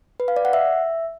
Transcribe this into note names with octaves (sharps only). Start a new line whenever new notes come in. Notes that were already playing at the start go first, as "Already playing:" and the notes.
B4
F5
D5
F#5
E5